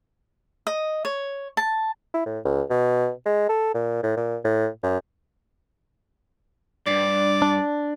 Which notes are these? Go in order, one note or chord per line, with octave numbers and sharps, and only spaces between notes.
D#5
C#5
A5
E4
A2
C#2
B2
G#3
A4
A#2
A2
A#2
A2
F#2
G2 D5
D4